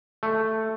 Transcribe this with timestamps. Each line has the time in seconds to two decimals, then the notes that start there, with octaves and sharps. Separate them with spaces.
0.23 A3